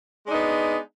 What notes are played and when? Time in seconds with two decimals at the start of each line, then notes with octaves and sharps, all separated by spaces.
0.25 G#3
0.28 D4
0.31 D#4
0.34 B3